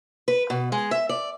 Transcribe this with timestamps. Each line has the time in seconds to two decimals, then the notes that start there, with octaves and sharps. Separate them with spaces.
0.28 B4
0.50 B2
0.72 G#3
0.91 E5
1.09 D5